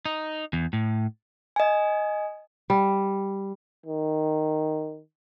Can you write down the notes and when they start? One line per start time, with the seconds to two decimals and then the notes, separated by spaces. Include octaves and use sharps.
0.06 D#4
0.53 E2
0.73 A2
1.56 D#5 G#5
2.70 G3
3.86 D#3